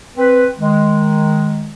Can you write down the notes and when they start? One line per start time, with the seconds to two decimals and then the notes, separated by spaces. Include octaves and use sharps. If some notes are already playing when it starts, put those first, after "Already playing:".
0.17 C4 B4
0.59 D#3 G#3